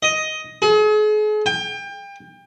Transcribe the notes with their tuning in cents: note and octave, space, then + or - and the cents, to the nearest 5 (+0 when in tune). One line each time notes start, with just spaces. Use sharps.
D#5 +10
G#4 +40
G5 +30